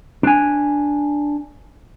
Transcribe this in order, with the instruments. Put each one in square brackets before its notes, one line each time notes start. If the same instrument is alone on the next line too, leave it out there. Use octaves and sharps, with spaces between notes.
[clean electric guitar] D4 G#5